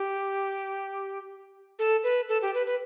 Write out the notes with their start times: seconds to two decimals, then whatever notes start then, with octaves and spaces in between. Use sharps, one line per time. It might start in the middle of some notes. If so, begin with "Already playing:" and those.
Already playing: G4
1.79 A4
2.04 B4
2.29 A4
2.42 G4
2.54 B4
2.66 B4